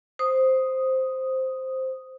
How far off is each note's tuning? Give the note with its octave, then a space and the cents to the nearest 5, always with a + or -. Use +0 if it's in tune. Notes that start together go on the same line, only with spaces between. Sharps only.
C5 +0 D#6 +0